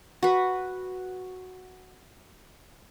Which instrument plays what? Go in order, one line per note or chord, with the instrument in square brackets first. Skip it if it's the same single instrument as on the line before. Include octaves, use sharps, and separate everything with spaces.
[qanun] F#4 B4